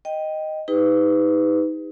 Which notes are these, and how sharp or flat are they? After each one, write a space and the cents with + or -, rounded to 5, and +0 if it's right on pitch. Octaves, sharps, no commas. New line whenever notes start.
D#5 +0 G5 +0
D#4 +25 G4 +45 B4 +25